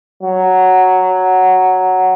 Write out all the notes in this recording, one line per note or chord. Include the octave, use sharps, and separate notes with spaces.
F#3